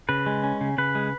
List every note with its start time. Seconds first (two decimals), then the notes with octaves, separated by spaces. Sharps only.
0.09 C#3 B4
0.26 G#3
0.44 C#4
0.61 C#3
0.78 C#3 B4
0.95 G#3